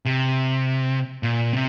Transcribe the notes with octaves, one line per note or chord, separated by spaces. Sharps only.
C3
A#2
C3